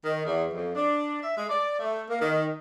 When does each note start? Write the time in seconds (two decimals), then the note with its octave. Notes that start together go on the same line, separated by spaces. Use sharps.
0.05 D#3
0.25 E2
0.52 F2
0.76 D4
1.21 E5
1.37 G#3
1.49 D5
1.79 A3
2.08 A#3
2.22 D#3